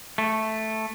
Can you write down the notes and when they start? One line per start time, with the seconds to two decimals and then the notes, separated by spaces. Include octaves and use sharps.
0.18 A3